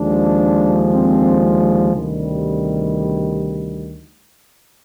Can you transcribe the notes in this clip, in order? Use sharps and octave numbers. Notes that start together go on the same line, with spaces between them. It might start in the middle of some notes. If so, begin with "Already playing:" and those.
Already playing: D#2 D3 F3 G#3 D4
C4
D2 C3 D#3 G3